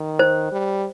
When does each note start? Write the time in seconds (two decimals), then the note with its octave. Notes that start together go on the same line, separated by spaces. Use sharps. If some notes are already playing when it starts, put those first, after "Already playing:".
Already playing: D#3
0.19 C5
0.52 G3